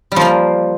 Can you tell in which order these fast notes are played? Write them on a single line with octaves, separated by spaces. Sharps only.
G3 F3 A#3